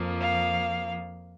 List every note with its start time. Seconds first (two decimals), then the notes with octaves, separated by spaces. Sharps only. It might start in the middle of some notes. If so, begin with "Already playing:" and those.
Already playing: F2 F3 A#3
0.21 F5